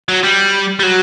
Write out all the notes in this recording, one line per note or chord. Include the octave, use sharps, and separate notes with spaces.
F#3
G3
G3
F#3